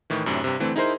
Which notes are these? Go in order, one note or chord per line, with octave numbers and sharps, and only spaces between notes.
A2 D#3 E3
F#2 A2 C3 D4
G2 C3
D3 E3 A3 C4
D#4 E4 G#4 A#4 C5 C6